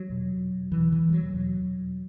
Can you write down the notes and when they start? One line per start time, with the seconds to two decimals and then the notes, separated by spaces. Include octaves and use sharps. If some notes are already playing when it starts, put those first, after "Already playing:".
Already playing: F#3
0.09 E2 B2
0.71 E2 B2 E3
0.92 E3
1.09 G3
1.13 F#3
1.34 E2 B2